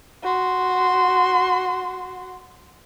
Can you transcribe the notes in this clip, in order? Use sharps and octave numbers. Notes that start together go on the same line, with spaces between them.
F#4 C6